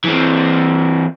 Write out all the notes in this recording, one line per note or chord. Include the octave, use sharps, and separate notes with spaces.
E3 C4